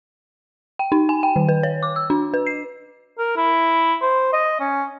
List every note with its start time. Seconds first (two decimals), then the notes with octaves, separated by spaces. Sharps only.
0.79 G5
0.92 D#4
1.09 G#5
1.23 G5
1.36 D#3
1.49 B4
1.63 C#5
1.83 D6
1.96 E6
2.10 D4
2.34 B4
2.47 C7
3.18 A#4
3.36 E4
4.01 C5
4.33 D#5
4.60 C#4